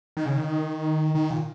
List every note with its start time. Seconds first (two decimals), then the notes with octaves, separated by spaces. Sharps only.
0.17 D#3
0.26 C#3
0.37 D#3
1.15 D#3
1.31 A#2